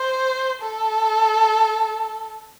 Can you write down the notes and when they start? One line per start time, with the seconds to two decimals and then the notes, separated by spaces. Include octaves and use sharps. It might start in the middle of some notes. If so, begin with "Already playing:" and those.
Already playing: C5
0.62 A4